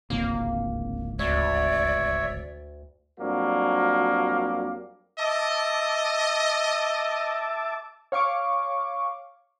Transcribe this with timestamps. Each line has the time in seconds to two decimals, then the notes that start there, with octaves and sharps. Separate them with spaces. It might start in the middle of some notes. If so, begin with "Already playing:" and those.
0.10 D1 G#1 C#2 A#3
1.19 D2 C#5 D5 E5
3.19 F2 F#3 G3 A#3 D4
5.19 D#5 E5 A5 D6
8.12 C#5 F5 C#6 D6